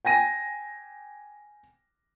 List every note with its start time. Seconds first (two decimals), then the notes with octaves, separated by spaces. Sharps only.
0.05 G5 G#5 A#6 D#7